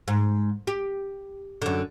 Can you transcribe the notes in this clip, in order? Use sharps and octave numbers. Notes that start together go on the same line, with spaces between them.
G#2
G4
F#2 D3